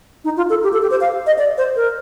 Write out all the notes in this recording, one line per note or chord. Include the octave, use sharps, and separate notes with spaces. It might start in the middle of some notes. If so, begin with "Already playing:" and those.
D#4
F4
A4
G4
A4
G4
C5
F5
D#5
D5
C5
A#4